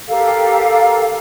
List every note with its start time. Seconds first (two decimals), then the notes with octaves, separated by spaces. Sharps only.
0.08 G4 A4 A#4 F5